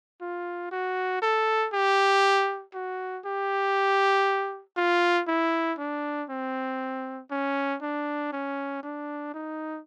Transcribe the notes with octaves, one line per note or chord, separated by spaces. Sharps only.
F4
F#4
A4
G4
F#4
G4
F4
E4
D4
C4
C#4
D4
C#4
D4
D#4